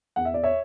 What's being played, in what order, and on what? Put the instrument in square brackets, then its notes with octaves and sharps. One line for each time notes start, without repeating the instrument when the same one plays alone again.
[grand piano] E2 F#5
E5
D5
C#5 E5